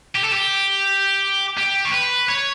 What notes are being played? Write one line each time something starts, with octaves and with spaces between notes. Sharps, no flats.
G4
A4
G4
G4
C#5
B4
C#5